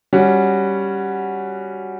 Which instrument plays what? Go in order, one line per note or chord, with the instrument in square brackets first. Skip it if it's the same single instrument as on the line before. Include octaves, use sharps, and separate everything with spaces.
[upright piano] G3 C#4 F#4